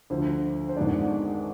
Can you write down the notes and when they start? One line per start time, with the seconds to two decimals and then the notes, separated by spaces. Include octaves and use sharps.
0.10 D2 D3 F3 C5
0.69 C5
0.77 G#1 G#2 G#3 B3 D4 D5